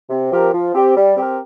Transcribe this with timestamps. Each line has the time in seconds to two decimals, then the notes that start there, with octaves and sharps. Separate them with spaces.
0.10 C3
0.31 F3 C4 G4 A#4
0.53 F3
0.73 C4 G4
0.96 G3
1.16 C4 G4 A#4